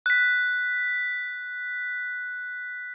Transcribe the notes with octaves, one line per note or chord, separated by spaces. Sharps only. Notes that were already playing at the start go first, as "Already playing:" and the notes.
F#6 B6